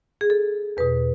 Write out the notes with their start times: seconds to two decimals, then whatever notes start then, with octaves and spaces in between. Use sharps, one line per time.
0.21 G#4
0.30 A4
0.77 E2 B2 B4